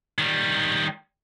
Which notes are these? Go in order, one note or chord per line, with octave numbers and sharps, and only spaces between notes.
D#3 G3